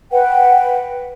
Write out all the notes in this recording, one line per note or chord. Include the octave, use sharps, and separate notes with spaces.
B4 F#5 G5